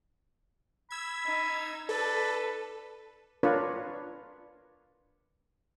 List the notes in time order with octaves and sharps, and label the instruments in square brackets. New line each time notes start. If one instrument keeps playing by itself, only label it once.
[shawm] B5 [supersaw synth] E6 G#6
[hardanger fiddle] D#4
[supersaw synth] A4 [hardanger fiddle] B4 [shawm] D5
[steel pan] D4 F4 A#4 B4 C#5 D5